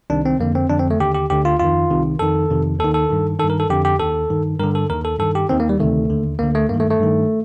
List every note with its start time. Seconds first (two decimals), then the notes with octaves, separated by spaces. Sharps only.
0.10 C2 C3 D#3 D4
0.26 C4
0.39 F2 D3 A#3
0.55 C4
0.70 F2 D3 D4
0.79 C4
0.91 A3
1.00 D#2 D3 G4
1.15 G4
1.30 D2 D3 G4
1.45 F4
1.59 F2 D#3 F4
1.90 C2 C3 D#3
2.19 F2 D#3 A4
2.50 F2 C3 D#3
2.79 D#2 D#3 A4
2.94 A4
3.10 G2 D#3
3.39 D#3 A4
3.44 G2
3.50 A#4
3.60 A4
3.70 F2 D3 G4
3.85 G4
3.99 D#2 D#3 A4
4.30 G2 D#3
4.59 G2 D3 A#4
4.75 A4
4.89 D#2 D#3 A#4
5.05 A4
5.19 G2 D#3 A4
5.35 G4
5.49 D#2 D#3 C4
5.60 A#3
5.69 G3
5.79 D2 C3 D#3 A3
6.10 D#2 D3
6.39 D2 D3 A#3
6.55 A3
6.69 G2 D#3 A#3
6.80 A3
6.90 A3
6.99 G2 D#3